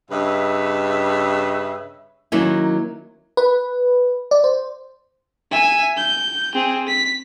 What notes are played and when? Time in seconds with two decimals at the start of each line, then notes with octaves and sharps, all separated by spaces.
0.11 G2 C#3 B4 D#5 E5
2.32 D#3 F#3 A#3 C#4 D#4 E4
3.37 B4
4.31 D5
4.44 C5
5.51 E5 G#5
5.97 G6
6.54 C4 G#4
6.88 B6